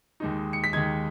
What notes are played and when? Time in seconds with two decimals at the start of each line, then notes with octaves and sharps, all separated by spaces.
0.20 D#2 D#3 G#3 D#4
0.53 C#7
0.64 B6
0.73 D#2 D#3 G#3 D#4 G#6